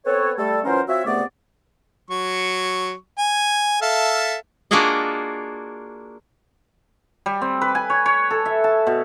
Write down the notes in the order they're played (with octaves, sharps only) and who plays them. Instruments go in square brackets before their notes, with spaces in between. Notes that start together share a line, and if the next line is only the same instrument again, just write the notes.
[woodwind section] B3 C4 A4 B4 C#5
G3 A3 A4
E3 F#3 C#4 F4 A#4 C5
C4 F4 F#4 C#5 E5
C#2 C3 A3 B3 D5
[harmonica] F#3 C#6
G#5
A4 E5 F5
[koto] A#3 D4 F4 F#4 G#4 D#5
[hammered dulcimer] G3
C4
B4
G#5
C#5
C#5
A4
E5
A5
B2